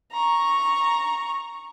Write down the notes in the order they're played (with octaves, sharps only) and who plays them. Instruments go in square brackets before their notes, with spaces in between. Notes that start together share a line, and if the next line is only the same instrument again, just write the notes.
[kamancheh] A#5 C#6